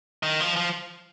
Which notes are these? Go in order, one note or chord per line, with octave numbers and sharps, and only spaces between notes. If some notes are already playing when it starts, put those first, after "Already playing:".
D#3
F3
F3